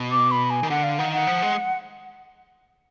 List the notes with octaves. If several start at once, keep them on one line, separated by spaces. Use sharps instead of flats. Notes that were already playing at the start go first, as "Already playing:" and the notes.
Already playing: B2
D6
B5
G#5
D#3
D3 F#5
F5
D#3 F#5
F#5
F3
G#3